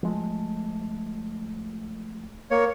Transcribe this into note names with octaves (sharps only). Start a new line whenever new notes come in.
F3 G#3 A3
A#3 C#5